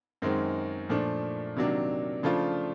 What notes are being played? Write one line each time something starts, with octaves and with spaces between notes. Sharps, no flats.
F#2 D#3 G#3 C4
A#2 F3 A3 D4
C3 D#3 F#3 A#3 D4
C#3 F3 A3 D4 F4